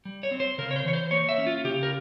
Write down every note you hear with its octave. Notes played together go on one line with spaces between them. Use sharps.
G3
C#5
C4
C5
C#3 A#4
C#5
C5
E3 C#5
C5
A#3 C#5
E5
C#4
F4
C#3 G4
A#4